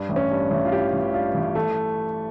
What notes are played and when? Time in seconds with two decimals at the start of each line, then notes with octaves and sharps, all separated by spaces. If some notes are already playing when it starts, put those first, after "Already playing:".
Already playing: G2
0.09 A1
0.16 C#4
0.31 G2
0.51 A1
0.65 F4
0.72 E3 G4
0.93 A1
1.13 G2 F4
1.35 A1
1.55 E3 A3